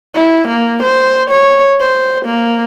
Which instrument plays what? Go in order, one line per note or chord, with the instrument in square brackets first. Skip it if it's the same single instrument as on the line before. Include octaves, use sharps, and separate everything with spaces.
[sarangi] E4
A#3
C5
C#5
C5
A#3